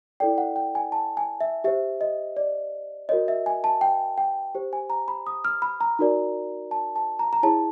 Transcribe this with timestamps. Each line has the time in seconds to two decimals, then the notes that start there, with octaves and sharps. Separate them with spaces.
0.20 E4 A4 D5 G5
0.38 F#5
0.56 G5
0.75 G#5
0.92 A5
1.17 G#5
1.41 E5
1.64 G4 C5 E5
2.01 D#5
2.37 D5
3.09 F#4 A#4 C#5 D#5
3.28 E5
3.46 G#5
3.64 A5
3.81 G5
4.18 G5
4.55 G4 C5
4.73 G#5
4.90 A#5
5.08 B5
5.27 D#6
5.45 F6
5.62 B5
5.81 A#5
5.99 D#4 F#4 A#4 D5
6.71 A5
6.96 A5
7.19 A#5
7.33 A#5
7.43 E4 G#4 C#5 A5